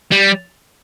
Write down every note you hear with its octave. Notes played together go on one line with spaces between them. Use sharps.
G3